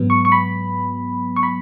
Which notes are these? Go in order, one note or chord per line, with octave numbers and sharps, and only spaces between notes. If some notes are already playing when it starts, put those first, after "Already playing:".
Already playing: G#2 F#3 B3
C#6
C#6
B5
C#6
B5